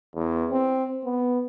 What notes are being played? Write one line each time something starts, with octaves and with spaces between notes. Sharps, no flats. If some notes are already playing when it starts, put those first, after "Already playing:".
E2
C4
B3